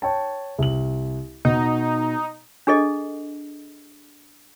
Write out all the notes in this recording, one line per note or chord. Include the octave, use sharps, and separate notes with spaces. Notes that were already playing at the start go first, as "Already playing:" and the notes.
C#5 G5 A5
C2 F#7
B2 D#4
D4 G#4 A4 D#5